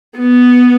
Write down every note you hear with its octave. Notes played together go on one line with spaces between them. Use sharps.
B3